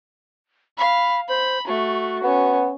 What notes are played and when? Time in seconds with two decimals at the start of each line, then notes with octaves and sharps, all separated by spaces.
0.78 F5 B5
1.29 C5 B5
1.67 A3 F#4
2.24 B3 C#4